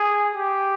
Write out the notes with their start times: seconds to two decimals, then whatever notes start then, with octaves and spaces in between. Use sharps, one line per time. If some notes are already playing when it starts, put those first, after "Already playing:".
Already playing: G#4
0.34 G4